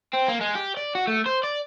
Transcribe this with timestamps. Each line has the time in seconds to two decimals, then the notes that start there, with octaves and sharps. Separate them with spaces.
0.13 C4
0.28 A#3
0.41 G#3
0.55 G4
0.77 D5
0.95 F#4
1.07 A3
1.26 C5
1.44 D5